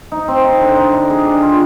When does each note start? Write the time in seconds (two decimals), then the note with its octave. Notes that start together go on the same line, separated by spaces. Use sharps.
0.12 D#4
0.28 C4
0.44 D#4
0.61 D3
0.77 D#4
0.93 D3
1.10 G#4
1.26 D4
1.42 F4